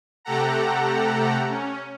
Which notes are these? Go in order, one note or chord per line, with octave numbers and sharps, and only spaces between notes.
C3 A3 G4 A4 F#5 A#5
C#4